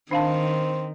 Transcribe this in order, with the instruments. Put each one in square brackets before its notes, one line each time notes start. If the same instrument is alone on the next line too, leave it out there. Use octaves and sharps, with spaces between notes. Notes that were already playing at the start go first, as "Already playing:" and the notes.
[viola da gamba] D#3 [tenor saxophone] C4 [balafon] D4 F5 A5